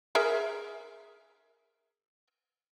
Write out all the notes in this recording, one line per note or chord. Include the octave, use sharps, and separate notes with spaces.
G#4 A#4 E5